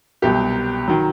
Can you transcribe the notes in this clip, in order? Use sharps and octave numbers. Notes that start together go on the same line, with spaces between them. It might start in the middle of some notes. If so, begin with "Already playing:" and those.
C2 B2 F#3 G4
D#3 F#3